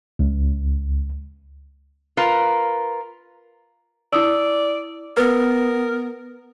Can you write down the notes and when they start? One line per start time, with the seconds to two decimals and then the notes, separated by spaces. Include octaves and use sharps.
0.19 C#2
2.17 F4 A#4 B4
4.13 E4 D5 D#6 E6
5.17 B3 A#4 B4